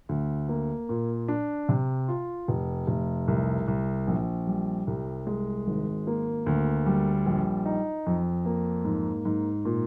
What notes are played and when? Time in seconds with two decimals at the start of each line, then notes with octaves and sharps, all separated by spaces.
0.09 D2
0.49 A#3
0.89 A#2
1.28 D4
1.69 C3
2.08 F4
2.48 F1
2.87 F1
3.28 C2
3.68 C2
4.07 A#1
4.47 G3
4.87 C2
5.27 G#3
5.67 G#1
6.07 A#3
6.46 D2
6.86 G3
7.26 A#1
7.65 D#4
8.06 F2
8.45 A#3
8.85 G#2
9.25 G#2
9.65 A#2